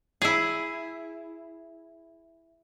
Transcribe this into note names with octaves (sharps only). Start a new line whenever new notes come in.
E4 G#4